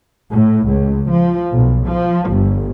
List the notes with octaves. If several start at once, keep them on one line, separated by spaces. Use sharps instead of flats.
A2
C#2
F3
B1
F3
G1